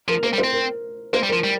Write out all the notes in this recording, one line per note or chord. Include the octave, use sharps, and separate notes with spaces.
F3 A#4
A#3 C5
G3
C5
C4
A#4
A#3 C5
G3
F3 A#4
G3